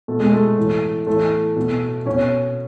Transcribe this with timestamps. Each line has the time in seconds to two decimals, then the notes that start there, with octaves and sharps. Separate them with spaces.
0.08 B2 A3
0.20 G#3
0.33 A3
0.57 A2 E3
1.07 A2 E3 A3
1.56 B2
2.06 B2 C#4